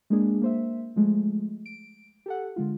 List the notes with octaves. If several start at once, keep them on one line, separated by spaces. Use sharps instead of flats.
G#3 A#3 D4 G#4
A#3 C5 E5
F3 G#3 A3
D7
G4 A4 F#5
D3 G#3 F4